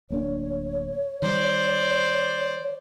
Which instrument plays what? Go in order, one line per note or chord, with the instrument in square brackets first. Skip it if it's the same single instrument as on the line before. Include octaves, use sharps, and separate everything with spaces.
[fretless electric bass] D1 A#3 D4 [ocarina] C#5
[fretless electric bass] D#3 G3 [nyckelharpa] C5 D5